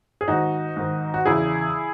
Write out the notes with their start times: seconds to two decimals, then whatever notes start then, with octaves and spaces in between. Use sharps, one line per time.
0.21 G#4
0.28 G#2 D#3 D#4 F#4
0.77 G#2 D#3
1.14 F#4
1.26 E2 C#3 E3 E4 G#4